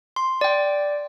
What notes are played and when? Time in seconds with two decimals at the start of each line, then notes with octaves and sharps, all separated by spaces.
0.16 C6
0.41 D5 G5